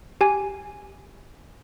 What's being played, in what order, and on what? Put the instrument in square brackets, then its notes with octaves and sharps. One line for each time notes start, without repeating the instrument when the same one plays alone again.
[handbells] G4 G#5